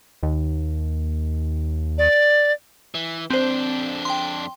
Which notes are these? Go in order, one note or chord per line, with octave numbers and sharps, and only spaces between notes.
D#2
D5
E3
F2 C4 D4 C5
G5 C6